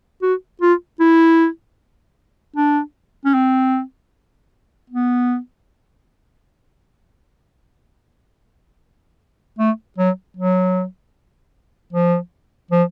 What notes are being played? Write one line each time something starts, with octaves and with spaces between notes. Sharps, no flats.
F#4
F4
E4
D4
C#4
C4
B3
A3
F#3
F#3
F3
F3